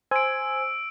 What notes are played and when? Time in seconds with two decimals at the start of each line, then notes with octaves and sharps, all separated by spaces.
0.11 C5 G#5 E6 D7